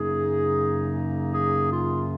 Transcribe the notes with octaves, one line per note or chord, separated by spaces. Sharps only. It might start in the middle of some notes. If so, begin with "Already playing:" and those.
Already playing: F#2 C#3 F#3 A#3 D#4 G#4
G#4
F4